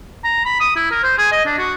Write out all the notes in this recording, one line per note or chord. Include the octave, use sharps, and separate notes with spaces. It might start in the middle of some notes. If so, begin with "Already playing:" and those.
A#5
B5
D#6
E4
A#4
C5
G#4
D#5
D4
F#4